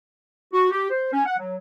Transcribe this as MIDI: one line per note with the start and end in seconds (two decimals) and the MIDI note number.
0.53 0.68 66
0.70 0.88 67
0.90 1.12 72
1.13 1.23 61
1.25 1.36 78
1.38 1.55 54